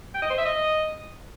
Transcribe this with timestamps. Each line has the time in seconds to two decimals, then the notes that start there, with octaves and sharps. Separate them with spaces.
0.14 G5
0.22 D#5
0.30 C5
0.38 E5
0.45 D#5